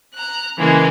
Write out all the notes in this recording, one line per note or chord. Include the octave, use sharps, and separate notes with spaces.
A#5 F#6
C#3 E3 G#3 A#3